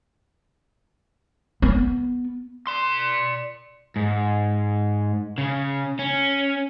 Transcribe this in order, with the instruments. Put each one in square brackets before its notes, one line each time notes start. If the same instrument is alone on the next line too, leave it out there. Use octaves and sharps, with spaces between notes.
[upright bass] B3
[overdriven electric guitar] D5 C6
G#2
C#3
C#4